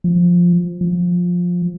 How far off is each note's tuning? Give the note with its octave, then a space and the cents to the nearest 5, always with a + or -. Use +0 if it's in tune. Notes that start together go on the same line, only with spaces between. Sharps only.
F3 +5
F3 +15